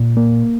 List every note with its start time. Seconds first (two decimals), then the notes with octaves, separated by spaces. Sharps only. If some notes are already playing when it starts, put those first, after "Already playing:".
Already playing: A#2
0.17 A#3